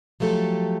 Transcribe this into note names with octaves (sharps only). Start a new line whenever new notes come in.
F3 F#3 A3 G4 A4